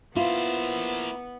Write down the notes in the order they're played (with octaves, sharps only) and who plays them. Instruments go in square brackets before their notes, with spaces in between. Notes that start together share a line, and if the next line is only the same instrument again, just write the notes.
[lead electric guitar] A#3 C5 [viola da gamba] B3 [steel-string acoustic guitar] E4 [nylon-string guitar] F4